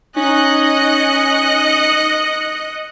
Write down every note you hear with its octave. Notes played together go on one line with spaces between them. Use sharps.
C#4 D#4 D#5 F#6 C#7